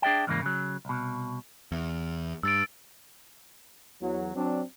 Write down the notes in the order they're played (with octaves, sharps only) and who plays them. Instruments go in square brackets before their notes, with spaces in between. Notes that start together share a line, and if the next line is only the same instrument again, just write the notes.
[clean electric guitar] D4 G#4 D5 E5 G5
E2 G#2 C#3 E3 A#3
C#3 F#3
C2 B2
[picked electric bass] E2
[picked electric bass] G2 [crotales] E6 A6 D7
[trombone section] E2 F#3
F#3 C4 D4